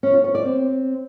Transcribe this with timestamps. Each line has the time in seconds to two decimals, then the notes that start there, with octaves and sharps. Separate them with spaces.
0.03 C#4
0.14 F4
0.24 C#5
0.35 D5
0.45 C4